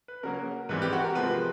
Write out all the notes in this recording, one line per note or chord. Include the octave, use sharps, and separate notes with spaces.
B4
C#3 F#3 A#3 A#4
G#2 E3 G3 C4 B4
G4
F#4
A#4
C3 F3 G#3 C4 B4